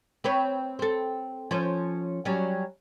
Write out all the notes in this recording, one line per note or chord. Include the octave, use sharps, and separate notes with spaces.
C4 B4 C#5
C4 A4
F3 C#4 C5
F#3 G3 C#4